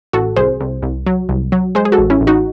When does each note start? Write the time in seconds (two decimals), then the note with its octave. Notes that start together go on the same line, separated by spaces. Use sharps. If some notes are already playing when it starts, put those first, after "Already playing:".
0.13 A1 F#4 A4
0.36 C2 G#4 C5
0.61 C2
0.82 C2
1.06 F#3
1.29 C2
1.52 F#3
1.75 G#3 G#4 C5
1.85 G#4
1.92 F#4 A4
1.98 A1
2.10 C#4 E4
2.21 A1
2.27 D#4 F#4